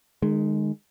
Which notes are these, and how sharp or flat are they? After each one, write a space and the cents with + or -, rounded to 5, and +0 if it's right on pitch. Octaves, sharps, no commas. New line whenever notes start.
D#3 -30 G#3 +0